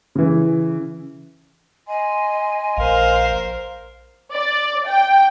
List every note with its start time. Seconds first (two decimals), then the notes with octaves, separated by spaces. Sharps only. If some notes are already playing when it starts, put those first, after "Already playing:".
0.15 C#3 E3
1.88 D#5 G#5 C6
2.77 A#1 A#4 C5 F5
4.33 D5
4.87 G5